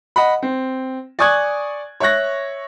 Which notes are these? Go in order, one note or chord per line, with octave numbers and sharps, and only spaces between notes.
D#5 F#5 B5
C4
D5 G#5 C#6 D#6 F#6 G#6
C#5 E5 C#6 F#6 A#6